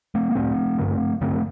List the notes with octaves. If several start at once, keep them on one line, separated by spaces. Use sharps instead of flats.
A3 C4
A#3
A2 A3 C4
G2 D3
G2 D3 A3 C4